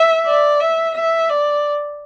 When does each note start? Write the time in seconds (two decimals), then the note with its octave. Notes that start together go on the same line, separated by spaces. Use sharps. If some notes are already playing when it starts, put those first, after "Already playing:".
Already playing: E5
0.26 D5
0.61 E5
0.95 E5
1.30 D5